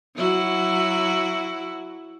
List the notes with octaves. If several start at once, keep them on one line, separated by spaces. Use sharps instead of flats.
F#3 E4 F#4